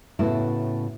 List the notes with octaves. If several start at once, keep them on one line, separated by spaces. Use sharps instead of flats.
A2 C#3 A3 B3 E4 F#4